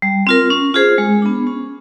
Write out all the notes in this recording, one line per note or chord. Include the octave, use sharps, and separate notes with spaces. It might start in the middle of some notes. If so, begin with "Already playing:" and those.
G3
C4 F4 A#4
C#4
F4 G#4 C5
G#3
B3 D4
C#4